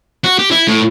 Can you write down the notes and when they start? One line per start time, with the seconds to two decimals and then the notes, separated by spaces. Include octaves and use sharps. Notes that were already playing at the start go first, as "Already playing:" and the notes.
0.24 F#4
0.39 G4
0.51 E4
0.68 A2